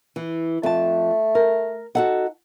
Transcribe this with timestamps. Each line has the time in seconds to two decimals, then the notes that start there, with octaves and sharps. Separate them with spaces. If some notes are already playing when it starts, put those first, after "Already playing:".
0.16 E3
0.63 F2 A3 A5
1.35 A#4
1.95 D#4 F#4 A4 F#5